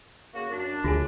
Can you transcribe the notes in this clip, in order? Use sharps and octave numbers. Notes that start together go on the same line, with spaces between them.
C#3 A#3 F#4
F#2 D4
D2 D3 F4 G#4 G#5